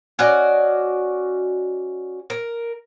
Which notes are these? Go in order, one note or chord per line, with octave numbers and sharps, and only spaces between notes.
C#4 F#4 D5 D#5
A#4